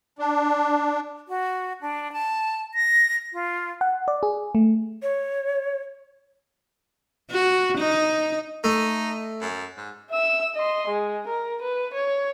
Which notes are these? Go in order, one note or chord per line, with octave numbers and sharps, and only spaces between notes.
D4
F#4
D4
A5
A#6
F4
F#5
D5
G#4
A3
C#5
F#4
D#4
A3 D#4
F#2
G#2
E5 E6
D#5 C6
G#3
A#4
B4
C#5